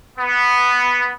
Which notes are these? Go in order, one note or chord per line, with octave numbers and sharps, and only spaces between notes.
B3